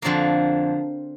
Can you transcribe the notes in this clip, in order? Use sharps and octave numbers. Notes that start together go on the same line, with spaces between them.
F2 D3 F3 A#3